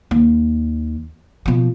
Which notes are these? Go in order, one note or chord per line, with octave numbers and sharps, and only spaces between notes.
D#2
B2 F3